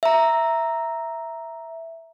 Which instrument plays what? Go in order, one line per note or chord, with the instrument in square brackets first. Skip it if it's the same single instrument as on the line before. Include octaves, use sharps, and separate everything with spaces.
[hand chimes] E5 A#5